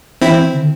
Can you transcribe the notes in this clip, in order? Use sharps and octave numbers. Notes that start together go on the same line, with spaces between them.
E3 C4 E4
D3